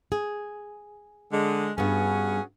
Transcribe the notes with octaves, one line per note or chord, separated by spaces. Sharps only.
G#4
D3 G#3
G2 B3 C#4 F#4 G#4